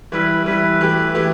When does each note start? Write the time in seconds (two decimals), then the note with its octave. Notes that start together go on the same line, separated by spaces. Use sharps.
0.12 E3 G3 E4 B4
0.46 E3 G3 E4 B4
0.81 E3 A3 E4 G4
1.15 E3 A3 E4 G4